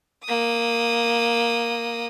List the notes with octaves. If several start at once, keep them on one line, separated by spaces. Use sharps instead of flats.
A#3 D#6